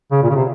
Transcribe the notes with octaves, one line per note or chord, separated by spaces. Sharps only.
C#3
A#2
C#3
C3